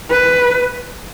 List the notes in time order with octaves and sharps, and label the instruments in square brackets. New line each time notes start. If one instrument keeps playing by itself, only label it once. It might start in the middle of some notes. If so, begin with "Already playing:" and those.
[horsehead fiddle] B4